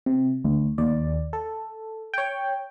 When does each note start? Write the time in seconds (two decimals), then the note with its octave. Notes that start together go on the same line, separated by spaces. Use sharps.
0.06 C3
0.44 D2
0.78 D#2 D5
1.33 A4
2.14 C#5 G5